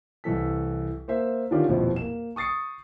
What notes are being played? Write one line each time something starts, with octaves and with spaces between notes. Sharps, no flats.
C2 E3 A4 B6
A#3 C5 E5
D3 D#3 C#4 F4 G4 D5
D#1 F2 B2 F3 E4
A#3 E7
C#6 D#6 A6 C7 C#7